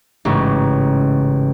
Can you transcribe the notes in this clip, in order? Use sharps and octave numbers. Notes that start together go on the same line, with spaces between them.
A1 G#2 C#3